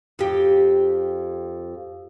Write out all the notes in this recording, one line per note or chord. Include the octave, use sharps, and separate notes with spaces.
F2 G4